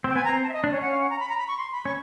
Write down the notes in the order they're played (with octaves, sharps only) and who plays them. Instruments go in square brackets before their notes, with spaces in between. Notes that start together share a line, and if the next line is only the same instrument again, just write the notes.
[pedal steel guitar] C4
[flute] G5
[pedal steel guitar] B3 [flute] G#5
[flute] A#5
[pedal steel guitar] C4
[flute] A5
E5
D#5
[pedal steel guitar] D4
[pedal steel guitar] C#4 [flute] C#5
[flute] F#5
F5
F#5
A#5
B5
A#5
B5
C#6
C6
B5
[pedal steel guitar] C#4 [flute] C#6